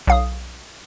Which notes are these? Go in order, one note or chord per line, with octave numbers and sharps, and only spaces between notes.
B1 F5 D#6